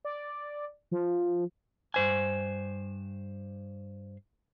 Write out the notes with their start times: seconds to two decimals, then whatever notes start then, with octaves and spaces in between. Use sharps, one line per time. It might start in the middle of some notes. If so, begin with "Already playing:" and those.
0.05 D5
0.91 F3
1.94 G2 C5 G#5